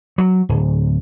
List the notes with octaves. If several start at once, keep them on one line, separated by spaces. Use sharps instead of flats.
F#3
D1